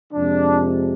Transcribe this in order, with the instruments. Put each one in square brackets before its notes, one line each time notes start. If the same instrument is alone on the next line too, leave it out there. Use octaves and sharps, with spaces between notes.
[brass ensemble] F2 C3 F3 G#3 D4